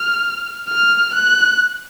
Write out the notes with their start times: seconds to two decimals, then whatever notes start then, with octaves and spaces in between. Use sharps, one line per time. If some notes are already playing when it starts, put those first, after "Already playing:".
Already playing: F6
0.69 F6
1.14 F#6